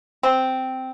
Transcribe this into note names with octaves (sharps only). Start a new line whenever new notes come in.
C4